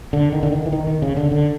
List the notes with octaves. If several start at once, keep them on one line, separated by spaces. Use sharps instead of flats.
D3
D#3
D3
D#3
E3
D#3
D#3
C#3
D3
D3